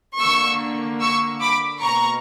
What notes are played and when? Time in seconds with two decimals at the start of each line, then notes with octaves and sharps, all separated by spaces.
0.20 D3 A#3 C#6 E6
1.01 C#6 E6
1.41 B5 D6
1.81 B2 A#3 A#5 C#6